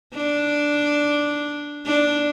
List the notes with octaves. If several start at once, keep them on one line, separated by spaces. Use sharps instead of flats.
D4
D4